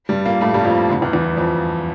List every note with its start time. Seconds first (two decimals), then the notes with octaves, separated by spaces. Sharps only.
0.09 G2 G3
0.25 A#2 A#3
0.41 A2 A3
0.54 G2 G3
0.65 F2 F3
0.89 D2 D3
1.01 E2 E3
1.13 E2 E3
1.37 F2 F3